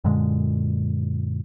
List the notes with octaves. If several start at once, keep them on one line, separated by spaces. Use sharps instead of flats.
F#2 A#2 D3 G#3